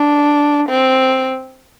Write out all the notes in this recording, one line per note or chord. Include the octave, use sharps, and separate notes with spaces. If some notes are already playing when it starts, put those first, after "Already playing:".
Already playing: D4
C4